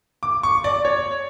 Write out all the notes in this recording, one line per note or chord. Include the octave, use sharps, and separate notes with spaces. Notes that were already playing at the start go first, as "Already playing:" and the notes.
D6
C#6
D5
C#5